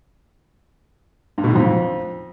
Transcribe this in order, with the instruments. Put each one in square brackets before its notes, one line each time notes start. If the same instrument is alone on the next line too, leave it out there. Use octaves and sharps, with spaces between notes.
[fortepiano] G2
B2
D#3
F2